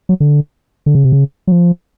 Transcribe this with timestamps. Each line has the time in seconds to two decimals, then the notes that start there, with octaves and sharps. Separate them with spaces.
0.09 F#3
0.20 D3
0.86 D3
0.95 C#3
1.04 C3
1.12 C#3
1.47 F#3
1.52 F3